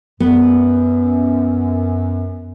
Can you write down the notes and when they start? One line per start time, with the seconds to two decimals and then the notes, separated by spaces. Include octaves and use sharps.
0.20 F#2 B3